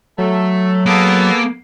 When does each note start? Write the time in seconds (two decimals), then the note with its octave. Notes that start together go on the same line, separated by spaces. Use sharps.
0.18 F#3 A3
0.86 A#3 B3 G#4 A4